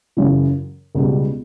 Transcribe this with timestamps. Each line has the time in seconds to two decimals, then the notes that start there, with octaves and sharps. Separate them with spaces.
0.17 F#2 C#3 E3
0.95 C#2 B2 G3